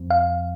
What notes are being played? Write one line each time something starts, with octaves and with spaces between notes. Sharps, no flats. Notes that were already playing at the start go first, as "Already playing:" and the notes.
Already playing: F2
F5